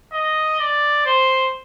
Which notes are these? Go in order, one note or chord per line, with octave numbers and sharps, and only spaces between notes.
D#5
D5
C5